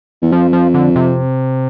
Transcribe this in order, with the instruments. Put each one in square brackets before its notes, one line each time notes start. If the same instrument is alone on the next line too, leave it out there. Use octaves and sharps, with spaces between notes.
[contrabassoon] E2
[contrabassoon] F2 [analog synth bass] F3
[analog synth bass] F3
D3
C3